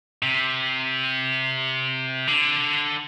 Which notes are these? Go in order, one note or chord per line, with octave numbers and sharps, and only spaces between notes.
C3
D3